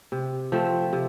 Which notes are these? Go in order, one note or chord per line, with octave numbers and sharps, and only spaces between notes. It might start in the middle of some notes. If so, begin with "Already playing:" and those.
C3
F3 A3 C4
C3